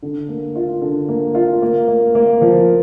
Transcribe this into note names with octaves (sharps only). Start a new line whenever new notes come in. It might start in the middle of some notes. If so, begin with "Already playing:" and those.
D3
A#3
F4
D3
A#3
F4
A#3
A#3
A#3
F3